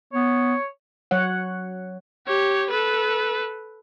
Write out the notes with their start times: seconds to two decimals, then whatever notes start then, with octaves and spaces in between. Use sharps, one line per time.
0.13 B3 C#5
1.11 F#3 C#5 F#5
2.27 G4 C#5
2.70 A4 B4